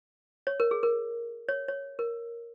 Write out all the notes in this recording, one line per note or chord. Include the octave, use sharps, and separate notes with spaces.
C#5
A#4
G#4
A#4
C#5
C#5
A#4